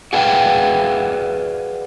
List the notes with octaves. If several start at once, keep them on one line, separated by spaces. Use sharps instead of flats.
F#4 G#4 B4 D5 F5 G5